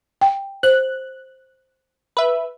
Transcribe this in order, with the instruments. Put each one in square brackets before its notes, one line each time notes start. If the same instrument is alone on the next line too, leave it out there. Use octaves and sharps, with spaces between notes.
[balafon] G5
[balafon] C5 [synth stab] F#6
[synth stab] B4 E5